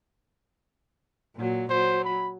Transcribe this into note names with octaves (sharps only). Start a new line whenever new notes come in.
A#2 F#3
F#3 C5
B5